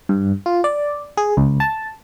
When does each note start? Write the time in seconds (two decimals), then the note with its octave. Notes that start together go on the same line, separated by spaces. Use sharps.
0.09 G2
0.46 F4
0.64 D5
1.17 G#4
1.37 C#2
1.60 A5